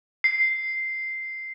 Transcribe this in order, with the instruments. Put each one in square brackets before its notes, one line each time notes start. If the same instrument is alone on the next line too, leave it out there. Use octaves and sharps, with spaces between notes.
[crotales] C7